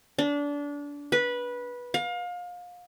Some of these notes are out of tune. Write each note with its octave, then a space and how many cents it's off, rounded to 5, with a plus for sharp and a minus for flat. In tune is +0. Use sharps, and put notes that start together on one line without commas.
D4 -25
B4 -15
F5 +30